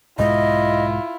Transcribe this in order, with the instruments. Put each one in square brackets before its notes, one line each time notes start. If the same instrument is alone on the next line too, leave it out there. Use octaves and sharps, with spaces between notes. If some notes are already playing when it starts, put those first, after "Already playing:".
[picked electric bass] B1 G#2 G#3 [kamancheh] E4 F4 [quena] D#5